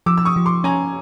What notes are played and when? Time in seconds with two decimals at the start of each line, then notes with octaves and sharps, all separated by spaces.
0.06 F3 D6 E6
0.17 E6
0.25 C#6 D#6
0.36 F3
0.46 C6 D6
0.64 C#4 G#5 A#5